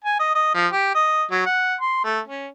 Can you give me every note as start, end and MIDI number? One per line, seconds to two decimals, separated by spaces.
0.04 0.18 80
0.19 0.34 75
0.35 0.53 75
0.54 0.67 53
0.73 0.91 67
0.95 1.24 75
1.31 1.46 54
1.46 1.75 78
1.81 2.02 84
2.04 2.20 57
2.27 2.48 61